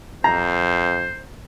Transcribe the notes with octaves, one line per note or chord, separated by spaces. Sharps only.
F2 C5 A#5